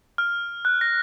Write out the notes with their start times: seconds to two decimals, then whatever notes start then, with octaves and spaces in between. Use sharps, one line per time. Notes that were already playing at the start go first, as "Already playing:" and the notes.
0.18 F6
0.65 F#6
0.81 A#6